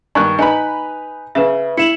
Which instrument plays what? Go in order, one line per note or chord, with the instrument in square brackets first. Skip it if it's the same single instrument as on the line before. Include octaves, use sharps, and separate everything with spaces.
[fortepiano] G2 D#3 F#6 [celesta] C#6
[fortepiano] D#4 B4 B5 [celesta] G#5
[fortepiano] C#3 [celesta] B4 E5
[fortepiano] E4 [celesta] C#7 E7 F#7